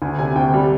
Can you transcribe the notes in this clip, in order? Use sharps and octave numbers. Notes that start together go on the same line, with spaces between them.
D2 G#5
C3 G#5
D2 G5
G3